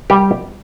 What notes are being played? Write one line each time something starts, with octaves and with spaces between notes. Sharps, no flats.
G3 G4